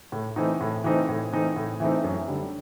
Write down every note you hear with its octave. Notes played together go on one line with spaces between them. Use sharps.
A2
E3 A3 C4 D#4
A2
E3 A3 C4 D#4
A2
E3 A3 C4 D#4
A2
E3 A3 C4 D#4
F#2
D3 G3